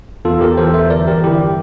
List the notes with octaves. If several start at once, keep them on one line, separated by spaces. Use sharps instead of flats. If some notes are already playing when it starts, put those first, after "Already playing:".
E2 F4 A4
G4 A#4
E3 A4 C5
C5 E5
G1 A#4 D5
G4 A#4
G1 E4 G4